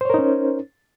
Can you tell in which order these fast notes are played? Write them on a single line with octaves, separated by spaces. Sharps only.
C5 C#5 A#4 D#4 C#4